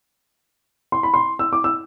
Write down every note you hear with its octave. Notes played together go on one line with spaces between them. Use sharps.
C6
B5
C6
E6
D6
E6